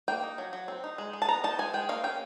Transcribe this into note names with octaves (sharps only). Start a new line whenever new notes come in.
A#3 G5
D#4
F#3
F#3
C4
D#4
G#3
G#3
A5
B3 A#5
D#4 A5
G#3 G#5
G#3 G5
A#3 F5
C#4 G5